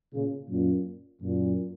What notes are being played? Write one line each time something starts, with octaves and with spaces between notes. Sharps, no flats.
A#2 C#3
F#2 A#2
F#2 A#2